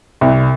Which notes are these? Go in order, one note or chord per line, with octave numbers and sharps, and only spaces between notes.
C2